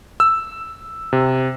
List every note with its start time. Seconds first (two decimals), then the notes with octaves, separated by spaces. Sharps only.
0.20 E6
1.13 C3